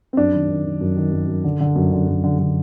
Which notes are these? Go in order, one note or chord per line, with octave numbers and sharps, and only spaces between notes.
C4
F#2 D4
D#3
D#3
D#3
F#2
D#3
F#2
F#2
D3
D3
F#2
D3
F#2
D3
D3